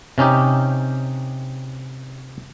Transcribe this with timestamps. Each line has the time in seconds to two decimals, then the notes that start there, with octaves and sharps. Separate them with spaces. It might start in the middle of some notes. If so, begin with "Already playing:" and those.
0.18 C3 C#4 D#4 G4